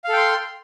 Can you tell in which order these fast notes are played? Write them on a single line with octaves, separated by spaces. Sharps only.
F5 A4 G5 C6